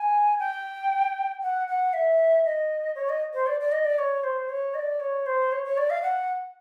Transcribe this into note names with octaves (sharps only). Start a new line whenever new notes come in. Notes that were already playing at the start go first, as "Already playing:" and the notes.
Already playing: G#5
G5
F#5
F#5
E5
D#5
C#5
D#5
C5
D5
D5
D#5
D5
C#5
C5
C#5
D#5
D5
C#5
C5
C#5
C#5
D5
F5
F#5